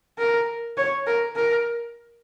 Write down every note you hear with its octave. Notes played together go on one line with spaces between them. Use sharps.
A#4
C#5
A#4
A#4